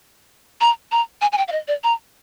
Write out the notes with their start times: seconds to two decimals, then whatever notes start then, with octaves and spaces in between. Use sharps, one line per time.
0.61 A#5
0.92 A#5
1.21 G#5
1.32 G#5
1.38 G5
1.48 F5
1.52 D#5
1.68 D5
1.84 A#5